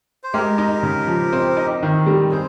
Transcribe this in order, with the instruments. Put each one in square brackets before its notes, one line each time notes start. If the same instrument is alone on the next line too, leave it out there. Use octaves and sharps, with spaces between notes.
[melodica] C5
[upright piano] G#3 [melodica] G4 A#4
[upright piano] D#4
C#3
F3
C4
D#4
D#3
G3
[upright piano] C4 [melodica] G#4 C5